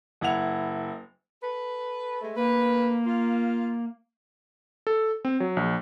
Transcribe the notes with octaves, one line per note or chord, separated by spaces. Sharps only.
F#1 E4 F#5 F7
A4 B4
G#3 A3
D2 A#3 B4
F4
A4
C4
F#3
A#1